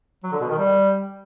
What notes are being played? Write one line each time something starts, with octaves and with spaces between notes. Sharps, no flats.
F#3
D3
B2
D#3
G3